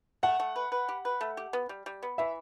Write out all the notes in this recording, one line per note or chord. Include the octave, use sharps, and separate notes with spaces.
A3 F#5
A3
B4
B4
G4
B4
A3
G4
B3
G3
G3
B3
E3 E5